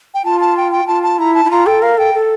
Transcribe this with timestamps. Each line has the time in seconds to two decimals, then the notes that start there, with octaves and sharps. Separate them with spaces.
0.14 G5
0.25 F4 A5
0.40 A5
0.57 G5
0.72 G5
0.87 F4 A5
1.03 A5
1.19 E4 A#5
1.34 A5
1.45 E4
1.50 F4 A#5
1.66 A4 G5
1.82 A#4 F5
1.98 A4 G5
2.14 A4